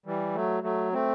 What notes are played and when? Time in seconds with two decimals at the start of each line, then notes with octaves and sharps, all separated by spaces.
0.06 E3 G3
0.34 F#3 A3
0.63 F#3 A3
0.93 A3 C4